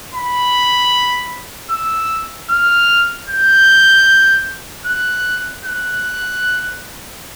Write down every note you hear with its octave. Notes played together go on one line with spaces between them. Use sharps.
B5
E6
F6
G6
F#6
F#6